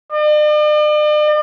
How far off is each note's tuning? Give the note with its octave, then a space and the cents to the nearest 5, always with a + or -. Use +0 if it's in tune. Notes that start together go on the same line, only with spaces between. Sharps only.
D5 +45